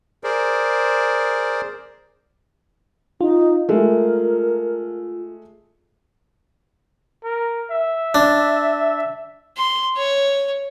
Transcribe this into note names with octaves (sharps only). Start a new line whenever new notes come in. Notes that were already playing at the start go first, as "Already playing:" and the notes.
G#4 A#4 C5 D5
D#4 F4
G#3 A3 A#4
A#4
E5
D4
C6
C#5